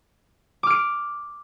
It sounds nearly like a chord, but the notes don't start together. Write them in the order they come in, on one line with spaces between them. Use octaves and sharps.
D6 F6 D7